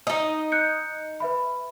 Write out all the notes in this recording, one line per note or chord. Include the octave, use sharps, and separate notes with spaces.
D#4 D#5
F#6 G6 C#7
B4 E5 B5